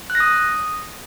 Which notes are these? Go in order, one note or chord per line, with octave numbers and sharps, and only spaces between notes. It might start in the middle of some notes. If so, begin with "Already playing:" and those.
F#6
A#6
D#6